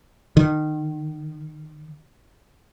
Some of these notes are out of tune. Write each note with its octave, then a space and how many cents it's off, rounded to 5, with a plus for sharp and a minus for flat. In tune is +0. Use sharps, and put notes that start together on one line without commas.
D#3 -25